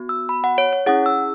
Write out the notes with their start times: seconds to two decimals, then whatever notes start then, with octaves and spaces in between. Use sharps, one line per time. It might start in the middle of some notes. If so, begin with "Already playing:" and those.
Already playing: B3 F#4
0.09 E6
0.29 B5
0.44 F#5
0.58 C#5
0.73 C#5
0.86 C#4 E4 G#4 F#5
1.06 E6